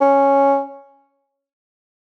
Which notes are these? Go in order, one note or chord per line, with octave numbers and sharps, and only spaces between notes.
C#4